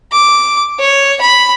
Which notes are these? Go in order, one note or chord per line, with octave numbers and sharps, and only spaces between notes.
D6
C#5
B5